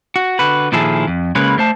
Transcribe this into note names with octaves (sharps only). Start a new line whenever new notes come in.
F#4
D3 F#4 B4
A#2 D#3 F3 E4 G#4 A4
F2
C#3 G#3 A#3 B4 C#5 B5
A3 C5 A5